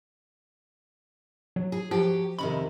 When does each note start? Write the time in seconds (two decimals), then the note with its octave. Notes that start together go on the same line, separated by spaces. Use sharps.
1.56 F#3
1.72 G#4
1.91 F3 F#3 G4
2.39 F2 C3 D#3 B5